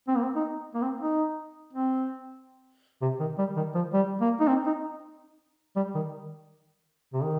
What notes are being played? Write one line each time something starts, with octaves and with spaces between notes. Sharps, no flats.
C4
A#3
C4
D#4
A#3
C4
D#4
C4
C3
D#3
G3
D#3
F3
G3
A#3
D#4
C4
D#4
G3
D#3
C3
D#3